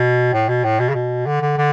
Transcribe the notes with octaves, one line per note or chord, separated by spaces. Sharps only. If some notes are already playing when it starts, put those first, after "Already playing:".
Already playing: B2
A2
B2
A2
B2
C#3
B2
D3
D3
D3